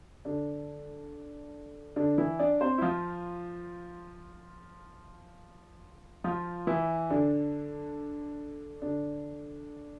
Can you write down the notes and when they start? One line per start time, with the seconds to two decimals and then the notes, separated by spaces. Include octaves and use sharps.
0.25 D3 D4
1.96 D3 D4
2.18 E3 E4
2.39 D4 D5
2.61 C4 C5
2.78 E4
2.82 F3 F4
6.24 F3 F4
6.67 E3 E4
7.10 D3 D4
8.82 D3 D4